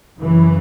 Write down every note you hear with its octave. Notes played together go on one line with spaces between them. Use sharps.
F#2 C#3 E3